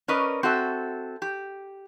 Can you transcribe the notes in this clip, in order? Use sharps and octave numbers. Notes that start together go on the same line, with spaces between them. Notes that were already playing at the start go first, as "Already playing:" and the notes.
C#4 A#4 B4 D5 D#5
C4 F#4 A4 E5
G4